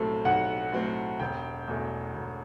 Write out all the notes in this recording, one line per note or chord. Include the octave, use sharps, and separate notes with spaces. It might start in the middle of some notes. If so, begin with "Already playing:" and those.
Already playing: B1 A2 F#3 C4 A4
B1 F#5
A2 F#3 C4
E1 G5
E2 B2 A3
E1